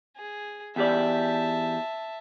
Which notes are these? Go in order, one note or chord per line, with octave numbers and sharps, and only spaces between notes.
G#4
E2 G4 D5 E5 A5